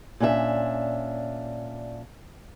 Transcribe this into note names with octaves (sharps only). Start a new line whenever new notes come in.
A#2 C#4 D4 F#4 E5